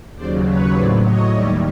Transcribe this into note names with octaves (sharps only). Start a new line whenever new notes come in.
D#2 C#3 F#3 C5 D5
B4 C#5
A2 F#3 C5 D5
C#5 D#5
D#2 D#3 G3 D5 E5